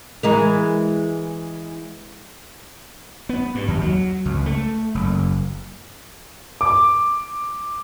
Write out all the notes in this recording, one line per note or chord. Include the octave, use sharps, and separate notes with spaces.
E3 G#3 A#4
B3
G2
D#2
F#3
C#2
A3
F#1
D6